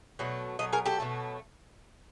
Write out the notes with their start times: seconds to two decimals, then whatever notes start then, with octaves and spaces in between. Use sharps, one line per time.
0.19 B2 F#3 A3
0.59 B2 F#3 A3 D#5
0.72 G#4 A#4
0.85 G4 A4
1.00 B2 F#3 A3